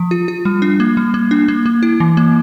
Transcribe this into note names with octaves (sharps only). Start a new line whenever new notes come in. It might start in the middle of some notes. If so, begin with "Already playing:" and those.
Already playing: F3
F4
F4
G3
D4
A#3
G3
A#3
D4
A#3
A#3
E4
E3
A#3